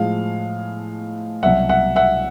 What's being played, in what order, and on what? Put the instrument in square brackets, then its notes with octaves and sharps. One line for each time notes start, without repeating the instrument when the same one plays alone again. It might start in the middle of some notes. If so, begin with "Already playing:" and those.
Already playing: [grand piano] A2 F3 G#3 F5
C2 B2 F#3 E5 F#5
E5 F#5
E5 F#5